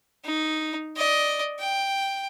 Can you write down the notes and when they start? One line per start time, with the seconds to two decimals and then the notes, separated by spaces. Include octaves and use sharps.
0.24 D#4
0.97 D5 D#5
1.60 G5